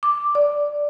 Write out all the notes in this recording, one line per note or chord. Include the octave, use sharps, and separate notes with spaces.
D6
D5